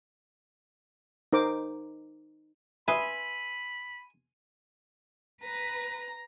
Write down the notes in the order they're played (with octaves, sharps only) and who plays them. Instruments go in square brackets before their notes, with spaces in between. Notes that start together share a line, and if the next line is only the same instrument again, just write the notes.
[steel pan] D#4 A#4 C5 D6
[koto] B4 [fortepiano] E5 D#6 [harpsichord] G#5 C6 [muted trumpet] B5
[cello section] B4 [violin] A#5